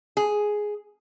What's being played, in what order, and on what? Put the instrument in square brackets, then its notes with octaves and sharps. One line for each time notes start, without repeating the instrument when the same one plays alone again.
[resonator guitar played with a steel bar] G#4